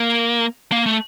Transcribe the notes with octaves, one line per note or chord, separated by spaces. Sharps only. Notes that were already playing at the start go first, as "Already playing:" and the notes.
Already playing: A#3
A#3
A3